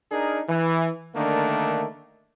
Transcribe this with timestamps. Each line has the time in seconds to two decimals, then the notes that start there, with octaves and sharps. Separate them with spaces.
0.12 D4 D#4 G#4 A#4
0.49 E3
1.16 D3 D#3 A3 A#3 D4